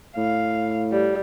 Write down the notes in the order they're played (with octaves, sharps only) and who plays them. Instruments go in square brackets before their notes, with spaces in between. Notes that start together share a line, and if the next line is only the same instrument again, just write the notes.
[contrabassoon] A2 [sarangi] F5
[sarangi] G3